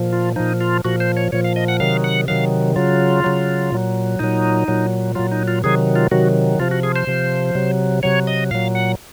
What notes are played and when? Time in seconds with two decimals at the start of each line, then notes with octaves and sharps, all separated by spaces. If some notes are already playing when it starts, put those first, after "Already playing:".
Already playing: A#2 F3
0.13 F4
0.36 A#2 F3 D#4
0.61 F4
0.85 A#2 F3 F#4
1.00 C5
1.17 C#5
1.32 A#2 F3 C#5
1.44 F5
1.56 D#5
1.68 F#5
1.80 C3 D#3 F#3 F5
2.04 F#5
2.28 C3 D#3 F#3 F5
2.76 C#3 F#3 F4
3.24 C#3 F#3
3.72 A#2 F#3
4.19 A#2 F#3 D#4
4.68 A#2 F#3
5.15 A#2 F#3 F4
5.32 D#4
5.48 F4
5.63 C3 D#3 F#3 G#4
5.96 F4
6.11 C3 D#3 F#3 F#4
6.59 C3 F3 F4
6.71 F#4
6.83 G#4
6.96 C5
7.07 C3 F3
7.55 C3 F#3
8.03 C3 F#3 C#5
8.27 D#5
8.51 A#2 F#3 F5
8.75 F#5